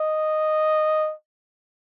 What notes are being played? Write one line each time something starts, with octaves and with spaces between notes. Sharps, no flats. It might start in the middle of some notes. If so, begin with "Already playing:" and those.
Already playing: D#5